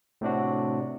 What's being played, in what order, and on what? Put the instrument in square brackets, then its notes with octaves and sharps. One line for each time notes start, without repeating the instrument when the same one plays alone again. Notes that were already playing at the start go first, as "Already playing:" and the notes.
[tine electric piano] A2 C3 D4 F#4